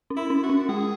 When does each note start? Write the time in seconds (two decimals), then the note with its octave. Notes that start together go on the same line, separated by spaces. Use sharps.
0.10 C#4
0.17 E4
0.30 C#4
0.43 F#4
0.49 C#4
0.69 G#3 G#4